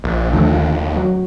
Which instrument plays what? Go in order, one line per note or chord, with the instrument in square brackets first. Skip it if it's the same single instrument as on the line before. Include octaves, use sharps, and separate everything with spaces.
[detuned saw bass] A#1
[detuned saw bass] D#2 [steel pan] D3 F3 A3
[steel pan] F#3